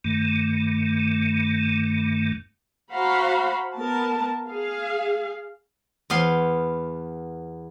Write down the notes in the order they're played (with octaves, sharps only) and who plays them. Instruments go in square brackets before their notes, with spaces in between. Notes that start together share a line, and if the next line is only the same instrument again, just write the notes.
[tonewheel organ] G2 D#3 A3
[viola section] F#4 C5 F5 F#5 A#5 B5
B3 A#4 A5
G#4 F5
[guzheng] E2 B3 F5 C6